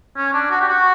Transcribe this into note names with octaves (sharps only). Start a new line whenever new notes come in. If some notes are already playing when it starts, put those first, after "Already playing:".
C#4
D4
F#4
G4
F#4